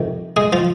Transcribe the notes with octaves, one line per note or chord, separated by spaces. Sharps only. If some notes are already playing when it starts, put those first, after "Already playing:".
Already playing: F2 C3 D#3
G#3 G#4
F3 F4